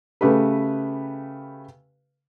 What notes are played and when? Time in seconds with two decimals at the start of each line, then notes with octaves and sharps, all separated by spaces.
0.21 C#3 A3 G4 B4